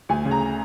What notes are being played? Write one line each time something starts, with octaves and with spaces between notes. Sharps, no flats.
D2 G#5
C#3
A#5